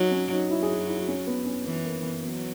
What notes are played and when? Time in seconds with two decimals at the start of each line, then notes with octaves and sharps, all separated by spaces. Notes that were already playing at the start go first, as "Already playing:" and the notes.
Already playing: F#3 D#4
0.11 C#4
0.31 D#4
0.50 F#3 E4
0.63 G#4
0.69 F#4
0.88 E4
1.08 C#4
1.27 B3
1.46 C#4
1.66 E3 B3
1.85 A#3
2.04 B3
2.23 F#3 B3